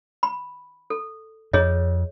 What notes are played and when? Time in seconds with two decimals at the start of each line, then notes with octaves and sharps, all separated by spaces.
0.23 B5
0.90 A4
1.53 F2 G#4 C#5 D#5